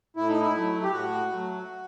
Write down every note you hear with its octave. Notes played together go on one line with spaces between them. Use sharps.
A2 E4
D#4
E4
F#3 A3
G4
A2 F#4
F#3 A3